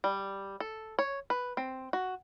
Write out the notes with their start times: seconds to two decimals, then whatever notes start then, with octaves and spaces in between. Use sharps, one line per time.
0.04 G3
0.60 A4
0.99 C#5
1.30 B4
1.57 C4
1.93 F#4